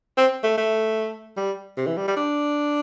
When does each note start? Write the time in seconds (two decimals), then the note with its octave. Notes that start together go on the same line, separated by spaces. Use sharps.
0.17 C4
0.43 A3
0.58 A3
1.37 G3
1.77 C3
1.87 E3
1.97 G3
2.08 G3
2.16 D4